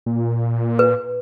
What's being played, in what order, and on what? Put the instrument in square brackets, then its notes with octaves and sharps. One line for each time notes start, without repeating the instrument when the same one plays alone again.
[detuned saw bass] A#2
[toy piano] B4